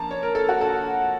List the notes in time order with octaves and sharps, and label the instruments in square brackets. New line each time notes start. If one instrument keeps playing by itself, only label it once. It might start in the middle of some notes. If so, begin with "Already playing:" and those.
Already playing: [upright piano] F3 A#3 A5 A#5
C#5
A#4
A4
F#4
A4